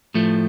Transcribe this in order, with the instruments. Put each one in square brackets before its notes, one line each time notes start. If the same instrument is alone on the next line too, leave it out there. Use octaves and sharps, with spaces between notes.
[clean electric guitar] A2 F3 A3